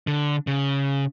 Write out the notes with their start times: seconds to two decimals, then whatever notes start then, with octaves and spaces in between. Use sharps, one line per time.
0.07 D3
0.47 C#3